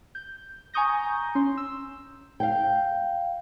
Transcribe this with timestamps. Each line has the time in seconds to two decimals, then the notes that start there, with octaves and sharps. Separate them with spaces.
0.15 G6
0.74 G#5 A#5 C#6 D#6 G6 A#6
1.35 C#4 C6
1.57 E6
2.40 F5 G5